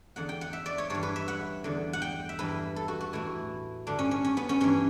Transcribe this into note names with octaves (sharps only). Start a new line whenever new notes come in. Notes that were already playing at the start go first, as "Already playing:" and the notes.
E2 D3 F#5
G5
F#5
E5
D5
C#5
G2 E3 C#5
B4
E5
F#5
E2 D3
F#5
G5
E5
G2 E3 B4
A4
F#4
F#4
A2 E3 E4
G2 D3 D4
C#4
C#4
C#4
B3
C#4
G2 E3 C#4